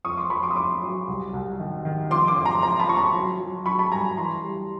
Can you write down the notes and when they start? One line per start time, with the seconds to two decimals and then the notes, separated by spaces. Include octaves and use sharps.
0.05 F2 C#6 D#6
0.17 C6 D6
0.30 F2 B5 C#6
0.43 C6 D6
0.51 D#6
0.56 F2 C6 D6
0.82 F#3
1.08 C2
1.33 C2
1.59 D#3
1.85 D#3
2.11 F3 C6 D6
2.27 C6 D6
2.36 F2
2.45 A#5 C6
2.62 F3 A#5 C6
2.79 A5 B5
2.88 F2 C#6
2.97 A#5 C6
3.14 F#3
3.40 F#3
3.66 F#3 B5 C#6
3.79 A5 B5
3.91 G2 G#5 A#5
4.17 E3 A#5 C6
4.43 G3